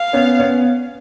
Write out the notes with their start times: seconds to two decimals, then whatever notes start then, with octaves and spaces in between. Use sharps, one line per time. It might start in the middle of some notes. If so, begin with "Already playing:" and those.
Already playing: F5
0.13 B3 C#4
0.39 B3 C#4